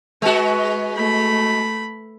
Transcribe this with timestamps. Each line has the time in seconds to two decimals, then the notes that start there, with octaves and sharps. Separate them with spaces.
0.22 G#3 F#4 B4
0.96 A3 B5